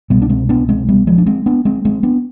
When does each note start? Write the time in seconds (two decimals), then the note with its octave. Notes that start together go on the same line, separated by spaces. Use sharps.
0.10 C2 B2 G3 B3
0.22 D4
0.29 G#3 C4
0.49 B3 D4
0.69 G#3 C4
0.88 G3 B3
1.07 F3 G#3
1.18 D4
1.26 G#3 C4
1.46 B3 D4
1.65 G#3 C4
1.85 G#3 C4
2.03 B3 D4